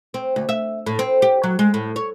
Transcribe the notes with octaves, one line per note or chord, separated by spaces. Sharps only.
C4
D2
E5
A2
C4
G4
F#3
G#3
A2
C#5